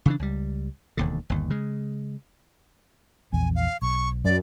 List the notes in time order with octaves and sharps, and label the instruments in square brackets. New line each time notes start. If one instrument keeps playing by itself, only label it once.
[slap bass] C#3 E3 D4
C#2 G3
E1 D#2 D3
G1 D#2
C#3 G#3
[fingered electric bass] A#1 E2 [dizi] G#5
[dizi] F5
[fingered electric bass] B1 [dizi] C#6
[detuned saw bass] F#2 [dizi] D5